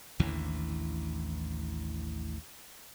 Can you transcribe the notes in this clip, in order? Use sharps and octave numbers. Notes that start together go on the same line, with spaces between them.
A1 D#2 D3 E3